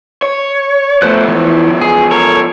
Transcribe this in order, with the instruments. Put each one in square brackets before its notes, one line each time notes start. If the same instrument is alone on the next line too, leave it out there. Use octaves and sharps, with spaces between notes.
[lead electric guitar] C#5
[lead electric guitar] F3 B3 [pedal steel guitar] A3 C5 F#6
[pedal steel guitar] E3
G#4
A4 A#4 C#5